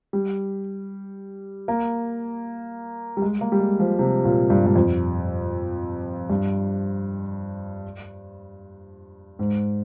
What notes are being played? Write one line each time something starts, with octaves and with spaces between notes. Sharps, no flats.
G3
A#3
G3
G#3
A#3
G3
G#3
F3
C3
A#2
G2
G2
F2
G2
G#2